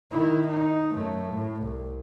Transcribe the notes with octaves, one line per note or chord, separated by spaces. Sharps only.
D#3 E4
D#4
F#2 A3
A2
C2